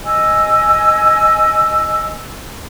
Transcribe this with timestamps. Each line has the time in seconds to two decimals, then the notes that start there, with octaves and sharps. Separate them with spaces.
0.04 D#5 G#5 E6